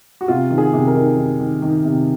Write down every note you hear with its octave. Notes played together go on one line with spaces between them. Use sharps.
F#4
C3 F4
D#3
G#4
C3
A#4
D#3
D#3
D#3
D#3
C3